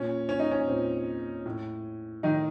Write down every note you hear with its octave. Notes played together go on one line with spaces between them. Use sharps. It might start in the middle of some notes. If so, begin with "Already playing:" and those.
Already playing: A#2 C#4
C#4
D#4
C#4
A#2 C4
A2
A2 D#3 D#4